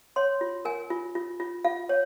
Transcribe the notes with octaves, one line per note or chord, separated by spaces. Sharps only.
C#5 C6
F4
A#4 G#5
F4
F4
F4
F4 F5
C#5